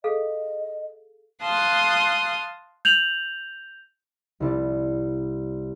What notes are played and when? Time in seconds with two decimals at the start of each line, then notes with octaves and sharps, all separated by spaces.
0.04 G#4 A4 D#5 F5
1.42 F5 A5 C6 D#6 F#6
2.85 G6 F7 F#7
4.40 C2 E4 D5